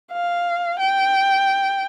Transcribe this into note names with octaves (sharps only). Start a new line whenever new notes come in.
F5
G5